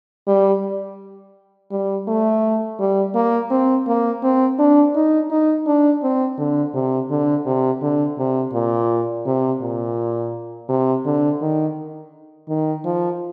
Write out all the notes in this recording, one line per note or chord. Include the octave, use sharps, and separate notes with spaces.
G3
G3
A3
G3
A#3
C4
A#3
C4
D4
D#4
D#4
D4
C4
D3
C3
D3
C3
D3
C3
A#2
C3
A#2
C3
D3
D#3
D#3
F3